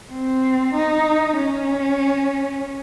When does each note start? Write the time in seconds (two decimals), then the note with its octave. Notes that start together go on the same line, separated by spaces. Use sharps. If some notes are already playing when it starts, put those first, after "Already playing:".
0.12 C4
0.75 D#4
1.37 C#4